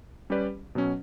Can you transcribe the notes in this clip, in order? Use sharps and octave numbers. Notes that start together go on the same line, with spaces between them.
G3 C#4 G4 B4 D5
B2 F#3 C#4